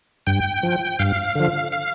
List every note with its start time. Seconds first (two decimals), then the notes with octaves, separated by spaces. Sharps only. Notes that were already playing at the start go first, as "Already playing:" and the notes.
0.27 G2 G5
0.63 F3
0.99 G2 F5
1.35 D3 F3
1.72 F5